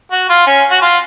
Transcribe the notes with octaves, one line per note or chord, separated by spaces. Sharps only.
F#4
F4
C#4
F#4
F4